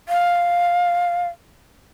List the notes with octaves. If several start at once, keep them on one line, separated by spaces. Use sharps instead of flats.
F5